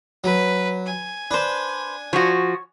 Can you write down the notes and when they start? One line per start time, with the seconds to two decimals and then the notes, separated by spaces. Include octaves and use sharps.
0.24 F#3 B4
0.86 G#5
1.31 D4 B4 C5
2.13 F3 F#4 C#5